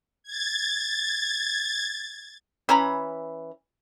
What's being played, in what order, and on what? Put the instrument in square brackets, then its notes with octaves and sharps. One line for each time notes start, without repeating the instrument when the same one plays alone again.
[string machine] G#6 A6
[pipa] E3 C#4 A#5 B5